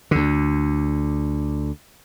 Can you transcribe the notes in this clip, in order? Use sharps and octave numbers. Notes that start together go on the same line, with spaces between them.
D2 D3